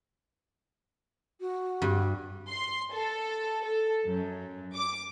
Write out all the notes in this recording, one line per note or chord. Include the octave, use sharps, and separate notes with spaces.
F#4
G2
C6
A4
A4
F#2
D6